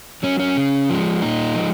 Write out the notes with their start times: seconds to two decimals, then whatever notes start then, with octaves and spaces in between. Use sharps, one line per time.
0.23 F#3 C#4
0.40 C#4
0.57 C#3
0.89 F3 G#3
1.22 A#2 D#4
1.54 F3 G#3